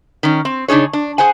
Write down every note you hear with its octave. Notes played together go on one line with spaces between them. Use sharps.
D#3 C#4
C4
C#3 D4 D#4 G#4 C#5
D4
G#4 C5 F#5 G#5